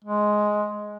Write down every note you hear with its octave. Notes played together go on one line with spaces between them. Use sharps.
G#3